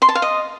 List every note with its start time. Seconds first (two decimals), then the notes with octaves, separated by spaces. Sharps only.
0.02 C6
0.09 A5
0.15 F5
0.22 D#5